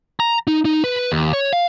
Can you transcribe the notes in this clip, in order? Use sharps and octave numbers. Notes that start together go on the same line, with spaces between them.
A#5
D#4
D#4
B4
D#2
C#5
F5